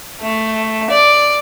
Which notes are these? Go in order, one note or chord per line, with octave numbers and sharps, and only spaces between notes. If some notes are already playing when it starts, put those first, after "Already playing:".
A3
D5